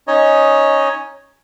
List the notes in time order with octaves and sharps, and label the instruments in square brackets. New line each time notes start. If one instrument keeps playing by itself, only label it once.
[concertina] C#4 D#4 C#5 D#5